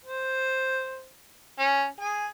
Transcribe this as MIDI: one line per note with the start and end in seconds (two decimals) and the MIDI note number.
0.05 1.08 72
1.59 1.86 61
2.00 2.27 68
2.00 2.27 80